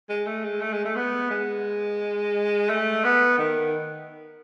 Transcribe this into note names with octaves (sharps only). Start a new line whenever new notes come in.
G#3
A3
G#3
A3
G#3
A3
B3
G#3
A3
B3
D#3